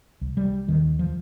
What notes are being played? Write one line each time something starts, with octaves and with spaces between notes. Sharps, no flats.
C2
G3
D#2 D#3
F3